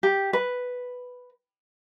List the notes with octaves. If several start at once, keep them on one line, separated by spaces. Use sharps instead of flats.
G4
B4